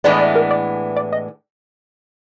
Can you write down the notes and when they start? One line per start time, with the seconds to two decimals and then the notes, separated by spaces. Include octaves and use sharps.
0.04 A2 E3 G#3 B3 D4 D5
0.12 D#5
0.19 D5
0.36 A#4
0.51 D5
0.97 D5
1.13 D#5